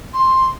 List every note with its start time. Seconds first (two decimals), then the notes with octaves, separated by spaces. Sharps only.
0.14 C6